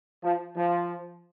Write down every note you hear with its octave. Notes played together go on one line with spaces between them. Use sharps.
F3
F3